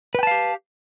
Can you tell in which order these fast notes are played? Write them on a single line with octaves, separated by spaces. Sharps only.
B4 G5 A5 F5 G4